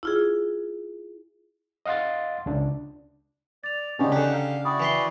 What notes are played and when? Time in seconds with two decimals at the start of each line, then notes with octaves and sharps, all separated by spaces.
0.03 E4 F4 G#4
1.86 D#5 F5 F#5 C6 A6
2.46 C#2 D4
3.63 D5 A6 F7
3.99 C#3 G#3 B3 C#4 D4 G4 G#5 C#6
4.12 D3 D#4 G4 F#5 G5
4.33 F5
4.65 E4 F#4 D5 G5 D#6
4.80 E3 B4 C6